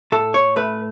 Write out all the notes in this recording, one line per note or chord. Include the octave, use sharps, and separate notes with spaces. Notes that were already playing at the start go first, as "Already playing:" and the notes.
A2 A4
C#5
A3 B4